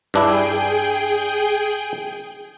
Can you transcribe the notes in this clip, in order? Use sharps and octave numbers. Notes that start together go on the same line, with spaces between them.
G2 D4 E4 G#4 G5